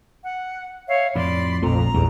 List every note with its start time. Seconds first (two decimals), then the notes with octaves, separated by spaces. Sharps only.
0.23 F#5
0.88 C#5 E5 F5
1.15 F2 A2 F3 D5 B5 C6
1.62 A#1 F2 A3 A#5
1.94 A#1 E2 G3